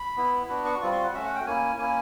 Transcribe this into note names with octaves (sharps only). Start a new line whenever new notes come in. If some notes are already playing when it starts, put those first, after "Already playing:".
Already playing: B5
B3 E4
B3 D4 F#4
C#6
G3 C4 F4 C#6
C6
F#5
A3 C#4 F#4 E5
F#5
G5
A#3 C#4 E4 G#5
A#3 C#4 E4 G#5